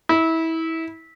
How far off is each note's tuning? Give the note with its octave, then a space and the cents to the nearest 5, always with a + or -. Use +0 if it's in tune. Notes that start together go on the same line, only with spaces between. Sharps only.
E4 -25